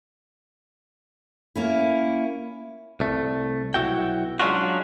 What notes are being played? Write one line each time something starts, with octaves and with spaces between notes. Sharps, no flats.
A#3 C#4 E4
C2 A3
B1 C#3 E4 F#4 G5
F#3 G#3 C#4 D4 F4 F#4